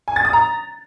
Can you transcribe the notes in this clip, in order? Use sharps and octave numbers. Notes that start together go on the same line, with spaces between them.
G#5
A6
D#6
A#5